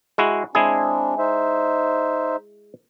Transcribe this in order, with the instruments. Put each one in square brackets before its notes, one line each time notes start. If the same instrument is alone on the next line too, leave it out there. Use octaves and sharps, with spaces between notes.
[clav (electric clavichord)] G#3 E4 F#4
[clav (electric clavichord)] G#3 E4 G#4 [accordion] C4 D4
[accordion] D#4 C5 E5